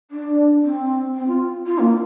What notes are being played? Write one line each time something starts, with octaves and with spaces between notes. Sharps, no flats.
D4
C4
C4
F4
F4
A#3